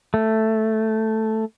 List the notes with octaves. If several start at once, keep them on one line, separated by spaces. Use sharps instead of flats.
A3